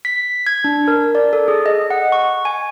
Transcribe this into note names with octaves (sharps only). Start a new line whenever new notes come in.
B6
G#6
D4
A#4
D5
A4
G#4
D#5
F#5
C#6
G#5